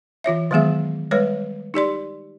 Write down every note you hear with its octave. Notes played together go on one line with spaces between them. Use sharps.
E3 F4 C#5 E5
D#3 F#3 G#3 B3 G#4 E5
G3 G#3 B4 C#5
D#4 G4 D5 C6